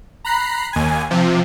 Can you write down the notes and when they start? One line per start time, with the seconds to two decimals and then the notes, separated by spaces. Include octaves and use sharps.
0.25 A#5 B5 F#6 C7
0.73 D#2 G#5
1.10 C3 F3